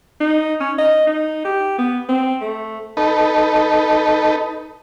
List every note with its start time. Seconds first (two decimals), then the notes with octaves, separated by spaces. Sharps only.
0.20 D#4
0.60 C#4
0.78 D#5
1.07 D#4
1.44 G4
1.78 B3
2.08 C4
2.41 A3
2.97 D#4 A4 B4